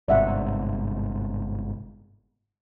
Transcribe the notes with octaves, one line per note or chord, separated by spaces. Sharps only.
G1 G#2 C3 D5 E5 F#5